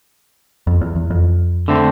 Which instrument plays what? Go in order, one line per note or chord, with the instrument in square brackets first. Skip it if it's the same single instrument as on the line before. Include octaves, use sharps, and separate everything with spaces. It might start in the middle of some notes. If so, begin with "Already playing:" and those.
[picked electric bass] F2
E2
E2
F2
[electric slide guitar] D3 A3 C4